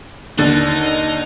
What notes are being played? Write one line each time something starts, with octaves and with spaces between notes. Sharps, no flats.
D#2 D3 D#4 A6